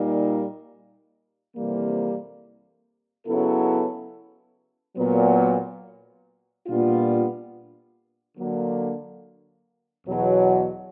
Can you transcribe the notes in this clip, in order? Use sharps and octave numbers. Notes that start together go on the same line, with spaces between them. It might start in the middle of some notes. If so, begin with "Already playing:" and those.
Already playing: A#2 G3 A#3 D#4
F2 C3 E3 G3 A#3
C#3 F#3 B3 E4 A4
A#2 F#3 B3
A#2 G3 B3 D4 F4
D3 F#3 A#3
E2 B2 F#3